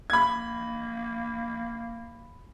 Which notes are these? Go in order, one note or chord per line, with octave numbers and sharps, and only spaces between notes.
A#3 B5 G#6